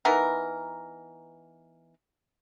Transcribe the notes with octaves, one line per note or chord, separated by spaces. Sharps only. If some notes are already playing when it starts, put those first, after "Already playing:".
E3 B3 D#4 A#4